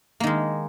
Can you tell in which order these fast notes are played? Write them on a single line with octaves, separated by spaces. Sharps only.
A#3 D#3 G#3